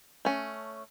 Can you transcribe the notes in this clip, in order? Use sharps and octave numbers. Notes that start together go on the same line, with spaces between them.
A3 C#4